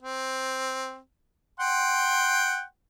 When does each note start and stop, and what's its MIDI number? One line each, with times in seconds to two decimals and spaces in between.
0.02 0.98 60
1.60 2.63 78
1.60 2.63 79
1.60 2.63 84